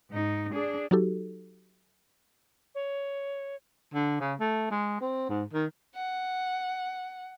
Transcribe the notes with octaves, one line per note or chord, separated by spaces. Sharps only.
G#2 D#4
D4 G#4
F#3 D#4 F#4 G4 A4
C#5
D3
C#3
A3
G#3
C4
G#2
D#3
F#5